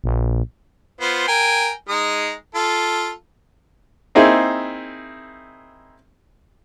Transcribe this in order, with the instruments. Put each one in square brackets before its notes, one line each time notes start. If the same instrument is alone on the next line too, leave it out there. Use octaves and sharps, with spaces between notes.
[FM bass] A#1
[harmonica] B3 F4 C5
A#4 G5 G#5
G#3 D#4 D#6
F4 A4
[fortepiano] A#3 C4 D#4 E4 G#4